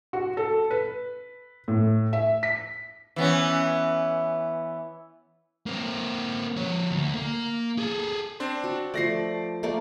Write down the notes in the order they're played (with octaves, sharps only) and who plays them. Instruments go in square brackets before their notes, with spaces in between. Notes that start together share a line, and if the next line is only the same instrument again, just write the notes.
[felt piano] F#4
A4
B4
A2
E5
B6
[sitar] E3 B3 C#4
[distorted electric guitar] A#3 C4
F3 C#5
D2
A#3
G#4 A4
[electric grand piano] C4 D4 C6
[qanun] F#4
[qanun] F3 A3 [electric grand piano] D5 A#6 C7
[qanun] A3 A#3 D5